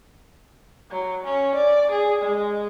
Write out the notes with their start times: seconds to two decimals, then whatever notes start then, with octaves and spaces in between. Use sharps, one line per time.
0.91 F#3
1.24 C#4
1.55 D5
1.91 G#4
2.22 G#3